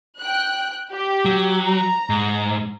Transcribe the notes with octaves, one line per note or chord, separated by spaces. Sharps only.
G5 F#6
G4
F#3
A#5
G#2